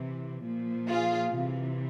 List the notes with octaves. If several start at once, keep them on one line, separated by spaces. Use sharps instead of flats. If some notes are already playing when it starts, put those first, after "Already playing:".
Already playing: C3 E3
A#2 F3
F4 G#4
C3 E3